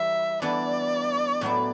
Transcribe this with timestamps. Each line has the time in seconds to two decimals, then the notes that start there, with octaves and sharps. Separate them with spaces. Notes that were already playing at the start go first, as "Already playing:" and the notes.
Already playing: E3 G3 E5
0.42 E3 B3 D4 D5
1.41 A2 F#3 B3 E4